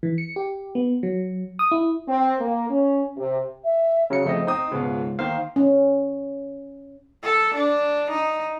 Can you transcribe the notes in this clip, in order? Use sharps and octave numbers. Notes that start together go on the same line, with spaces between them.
E3
C#7
G4
B3
F#3
D#6
E4
C4
A#3
C#4
C3
E5
C#3 F#3 C#7
F2 C#3 A3 C4 D#5
C4 D#4 D#5 D#6
C#2 G#2 B2 F4
D#3 A#3 C5 F5
C#4
A4
D4
D#4